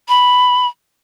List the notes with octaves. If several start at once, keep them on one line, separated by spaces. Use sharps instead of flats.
B5